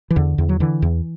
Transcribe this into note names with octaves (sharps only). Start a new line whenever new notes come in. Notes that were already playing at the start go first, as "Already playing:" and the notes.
E3
E2 D3
E2
F#3
D3 E3
E2